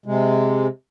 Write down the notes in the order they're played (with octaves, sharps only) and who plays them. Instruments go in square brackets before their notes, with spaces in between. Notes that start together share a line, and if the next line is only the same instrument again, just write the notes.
[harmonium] C3 G#3